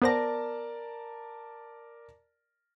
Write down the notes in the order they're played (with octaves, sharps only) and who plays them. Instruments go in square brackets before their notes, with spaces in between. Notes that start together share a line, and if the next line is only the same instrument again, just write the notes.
[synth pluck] B3 C5 A#6 [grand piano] A#4 D5 A5